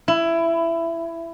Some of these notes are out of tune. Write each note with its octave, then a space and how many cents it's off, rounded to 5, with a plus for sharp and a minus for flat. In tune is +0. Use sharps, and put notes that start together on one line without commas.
E4 +15